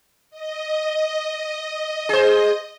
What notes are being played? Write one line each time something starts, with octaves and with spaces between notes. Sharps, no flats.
D#5
G#4 C5